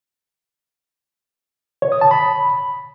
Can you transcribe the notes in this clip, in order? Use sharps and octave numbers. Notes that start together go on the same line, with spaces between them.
C#5
D#6
A5
B5